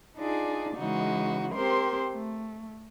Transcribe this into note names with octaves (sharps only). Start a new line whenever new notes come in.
D4 D#4 F4 G#4 D5
C#3 E3 G#3 D#4 F#4
C4 G4 A#4 C5 C6
A3